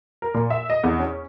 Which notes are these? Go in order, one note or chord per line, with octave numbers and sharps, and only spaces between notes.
A#4
A#2
E5
D#5
E2
C#4